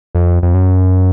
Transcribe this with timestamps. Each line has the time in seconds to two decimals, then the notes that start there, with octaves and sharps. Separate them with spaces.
0.15 F2
0.43 F2
0.54 F#2